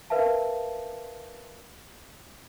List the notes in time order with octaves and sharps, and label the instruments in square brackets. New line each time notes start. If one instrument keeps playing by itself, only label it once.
[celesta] A#4 B4 E5 F5 A5